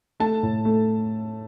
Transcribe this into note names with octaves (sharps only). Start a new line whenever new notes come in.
A3 A5
A2
A3